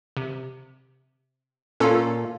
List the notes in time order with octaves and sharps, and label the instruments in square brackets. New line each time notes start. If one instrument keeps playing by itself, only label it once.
[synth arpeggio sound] C3
[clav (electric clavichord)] A#2 F4 [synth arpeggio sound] C#4 A4 C#5